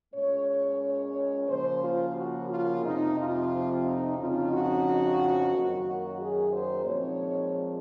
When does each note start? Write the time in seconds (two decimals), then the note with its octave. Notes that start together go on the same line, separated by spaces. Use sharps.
0.14 A#2 G#3 C#4 C#5
0.48 C#5
0.81 C#5
1.48 C#3 F3 A#3 C5
1.82 F4
2.15 F#4
2.50 F4
2.83 F2 C3 F3 C4 D#4
3.17 F4
3.83 D#4
4.17 F2 C#3 F3 C4 D#4 F4
4.51 F#4
5.53 F#2 D#3 F#3 A#3
5.85 F#4
6.20 G#4
6.53 C5
6.86 A#2 F3 G#3 C4 D#4 C#5